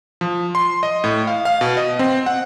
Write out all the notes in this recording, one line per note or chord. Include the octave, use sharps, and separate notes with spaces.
F3
C6
D#5
A2
F5
F5
B2
D#5
C4
F#5